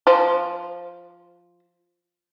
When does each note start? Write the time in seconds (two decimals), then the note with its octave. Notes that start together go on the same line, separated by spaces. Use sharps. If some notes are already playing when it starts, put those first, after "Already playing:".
0.07 F3 C5